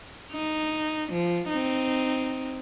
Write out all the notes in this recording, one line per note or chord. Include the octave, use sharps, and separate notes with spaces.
D#4
F3
C4 D#4